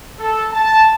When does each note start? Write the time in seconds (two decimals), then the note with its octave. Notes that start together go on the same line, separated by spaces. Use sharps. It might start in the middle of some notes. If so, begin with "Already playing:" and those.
0.18 A4
0.51 A5